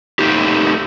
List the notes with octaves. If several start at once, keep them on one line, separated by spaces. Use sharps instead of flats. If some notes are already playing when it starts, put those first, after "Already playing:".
A3 D#4 G4